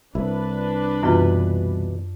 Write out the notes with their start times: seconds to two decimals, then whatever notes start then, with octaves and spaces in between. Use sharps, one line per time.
0.15 C2 D4 E4 B4
1.03 F#2 B2 E3 F4